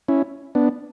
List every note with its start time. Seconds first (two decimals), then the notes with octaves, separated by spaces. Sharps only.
0.08 C#4 E4
0.55 B3 D4